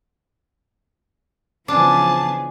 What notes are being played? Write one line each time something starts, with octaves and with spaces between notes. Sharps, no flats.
C#3 E3 F3 B3 D4 G#4 A5